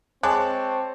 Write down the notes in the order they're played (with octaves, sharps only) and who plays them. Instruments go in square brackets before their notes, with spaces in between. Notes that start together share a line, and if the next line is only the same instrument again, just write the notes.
[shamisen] G#3 [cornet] C4 [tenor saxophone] C#5 [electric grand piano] A5 D6 F#6